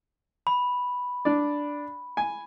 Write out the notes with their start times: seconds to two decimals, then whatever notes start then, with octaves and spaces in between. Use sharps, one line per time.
0.47 B5
1.25 D4 D5
2.17 G#5